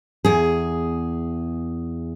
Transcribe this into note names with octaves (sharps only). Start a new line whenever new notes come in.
E2 G#4